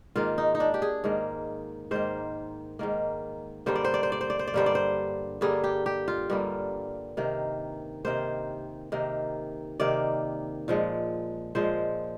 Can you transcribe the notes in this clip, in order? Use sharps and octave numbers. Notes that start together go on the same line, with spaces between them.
G#2 D#3 A#3 F4
D#4
D#4
D4
G4
G#4
G#2 D#3 A#3
G#2 D#3 A#3 C5
G#2 D#3 A#3
G2 D3 G3 A#3 C5
D5
C5
D5
C5
D5
C5
D5
C5
D5
G2 D3 G3 A#3 C5
D5
C5
G2 D3 G3 A#3 G#4
G4
G4
F4
G2 D3 G3 A#3
C3 D#3 A#3
C3 D#3 A#3 C5
C3 D#3 A#3
C3 D#3 A#3 D5
A#2 F3 G#3
A#2 F3 G#3 C5